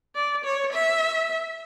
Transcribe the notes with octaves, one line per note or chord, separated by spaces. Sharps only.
D5
C#5
E5